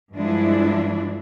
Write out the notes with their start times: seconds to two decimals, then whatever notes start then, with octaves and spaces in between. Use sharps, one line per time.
0.13 G2 F3 G#3 D4 E4